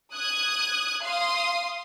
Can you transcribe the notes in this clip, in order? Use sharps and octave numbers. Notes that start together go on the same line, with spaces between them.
D#6 F#6 G#6
F5 C6 D#6